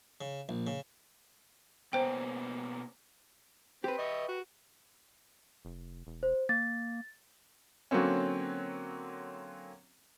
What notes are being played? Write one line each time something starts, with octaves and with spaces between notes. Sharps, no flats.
C#3
A#1
C#3
B2 A#3 C#4 C5 G5
C4 G4 B4
D#5 E5 C#6
F#4
F1
E1
C5
A#3 A6
D3 F#3 A#3 C4 C#4